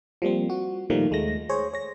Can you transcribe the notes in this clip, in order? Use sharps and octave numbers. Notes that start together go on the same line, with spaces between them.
F3 G3 A#3 C4
F#4
A#2 D#3 F3 G3 A3 A#3
D#2 G#3 A3 A#6
G#4 C5 C#5
C#5 A#6